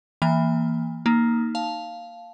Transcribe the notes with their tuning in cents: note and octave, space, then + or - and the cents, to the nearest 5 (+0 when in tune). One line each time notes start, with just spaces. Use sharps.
E3 +0 A#3 +0 G#5 -45
A#3 +0 D#4 +0
F5 +0 A5 -10